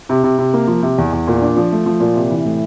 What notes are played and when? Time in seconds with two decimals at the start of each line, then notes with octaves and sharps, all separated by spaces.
0.09 C3
0.24 C3
0.38 C3
0.54 A#3
0.68 F3
0.82 C3
0.98 E2
1.13 E2
1.28 A#2
1.41 D4
1.57 F3
1.72 A3
1.86 F3
2.00 A#2
2.15 C3
2.30 E3
2.45 A2